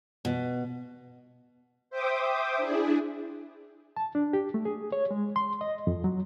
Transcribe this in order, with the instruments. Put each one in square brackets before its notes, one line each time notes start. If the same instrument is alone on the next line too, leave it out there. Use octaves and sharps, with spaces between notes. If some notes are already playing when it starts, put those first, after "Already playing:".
[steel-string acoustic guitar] B2
[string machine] C5 E5 G5 D6 D#6
D4 E4 G#4
[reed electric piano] A5
D4
G4
A3
G#4
C#5
G#3
C6
D#5
F2
F#3